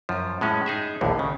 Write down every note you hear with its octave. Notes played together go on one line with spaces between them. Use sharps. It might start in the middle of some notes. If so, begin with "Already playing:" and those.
F#2 F3
A2 G#3 C#4
D#4 G#4 E5
A#1 D#2 A2 D3
C#3